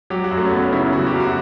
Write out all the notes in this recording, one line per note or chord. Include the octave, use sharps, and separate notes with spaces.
F#3 G4
F#4
F#2
A3
C#4
F#1 B3
C#3 E4
F#3 F#4
G4
F#2
F#4